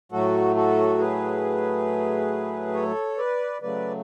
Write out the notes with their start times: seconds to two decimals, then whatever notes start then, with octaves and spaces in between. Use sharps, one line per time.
0.12 A2 F#3 A3 F#4 A4
0.56 F#4 A4
0.99 G#4 B4
2.74 A4 C#5
3.18 B4 D5
3.62 C#3 F#3 A3 B4 D5